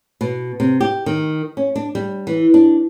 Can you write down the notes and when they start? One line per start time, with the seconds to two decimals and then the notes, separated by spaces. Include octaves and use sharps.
0.21 B2
0.60 C3
0.81 G4
1.06 D#3
1.57 C#4
1.76 D4
1.95 G3
2.27 E3
2.54 D4